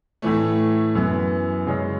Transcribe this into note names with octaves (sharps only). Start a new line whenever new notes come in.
A2 E3 A3
F#2 E3 B3 E4
F#2 C#3 G#3 C#4